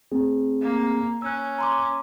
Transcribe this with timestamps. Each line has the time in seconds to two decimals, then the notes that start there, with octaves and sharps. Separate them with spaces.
0.12 A3 C4 G#4
0.62 A#3
1.22 C#4 E6 F#6
1.58 A#5 C6 D6